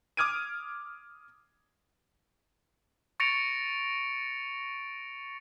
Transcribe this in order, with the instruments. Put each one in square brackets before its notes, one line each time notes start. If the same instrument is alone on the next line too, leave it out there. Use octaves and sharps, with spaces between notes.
[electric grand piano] D6 D#6 F6 G#6 D7 D#7
[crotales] C#6 A6 A#6 C#7 D7 F7